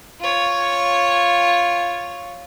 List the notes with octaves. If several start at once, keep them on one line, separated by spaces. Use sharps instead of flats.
F4 C#5